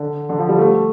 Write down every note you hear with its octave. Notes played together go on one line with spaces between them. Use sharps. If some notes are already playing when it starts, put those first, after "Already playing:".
Already playing: D3
D3
F3
G3
A3